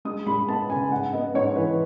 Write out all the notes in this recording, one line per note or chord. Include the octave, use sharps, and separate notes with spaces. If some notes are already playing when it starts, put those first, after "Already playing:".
G#3 D#6
G#3 B5
B3 A5
C#3 G#5
G#2 F#5
B3 D#5
G#2 C#5
E3 B4